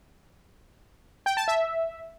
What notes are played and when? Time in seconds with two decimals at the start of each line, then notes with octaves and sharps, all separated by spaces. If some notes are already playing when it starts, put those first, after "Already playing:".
1.26 G5
1.37 A5
1.48 E5